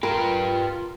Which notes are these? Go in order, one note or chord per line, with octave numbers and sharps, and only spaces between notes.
F4 G4 A#4 B4